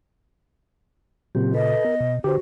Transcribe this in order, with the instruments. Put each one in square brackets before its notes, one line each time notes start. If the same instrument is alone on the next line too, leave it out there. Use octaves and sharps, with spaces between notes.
[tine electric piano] A#2 C#3 [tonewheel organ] F#3 C4 G4
[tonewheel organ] A4 B4 [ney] D#5
[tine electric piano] B3 [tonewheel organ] A#4
[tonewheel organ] B2
[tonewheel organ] D3 [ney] F#4 [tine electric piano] G4 B4 C5